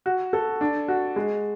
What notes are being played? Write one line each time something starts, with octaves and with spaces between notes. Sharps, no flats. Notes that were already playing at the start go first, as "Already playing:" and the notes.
F#4
A4
D4
F#4
G#3